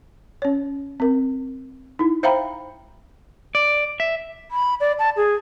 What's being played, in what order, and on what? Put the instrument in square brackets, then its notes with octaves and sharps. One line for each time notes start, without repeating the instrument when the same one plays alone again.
[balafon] C#4 C#5
C4 A#4
D#4 E4
C5 E5 F5 G5 A#5 B5
[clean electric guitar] D5
E5
[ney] B5
D5
A5
G#4